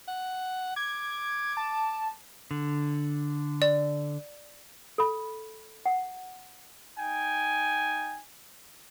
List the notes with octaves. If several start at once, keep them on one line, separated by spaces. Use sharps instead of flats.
F#5
D6 G#6
A5
D3
D5
A4 B5
F#5
D#4 G5 G#5